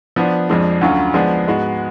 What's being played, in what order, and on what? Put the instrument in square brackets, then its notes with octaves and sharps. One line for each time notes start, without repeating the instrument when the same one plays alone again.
[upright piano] F3 B3 D4
F2 F3 G#3 D4
D2 D3 F#3 C#4 F4
F3 G#3 B3 D4
G#2 G#3 B3 F#4